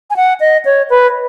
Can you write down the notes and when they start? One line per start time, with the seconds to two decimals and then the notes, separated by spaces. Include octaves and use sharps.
0.10 G#5
0.16 F#5
0.40 D#5
0.65 C#5
0.90 B4